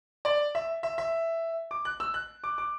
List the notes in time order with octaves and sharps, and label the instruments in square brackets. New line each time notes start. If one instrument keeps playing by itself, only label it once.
[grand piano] D5
E5
E5
E5
D6
F#6
E6
F#6
D6
D6